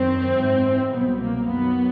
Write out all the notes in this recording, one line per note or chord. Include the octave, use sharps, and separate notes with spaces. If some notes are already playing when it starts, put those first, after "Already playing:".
Already playing: F#2 D#3 F#3 C4
G#2 E3
C2 B2 F#3 B3
A#3
F#2 D#3 F#3 B3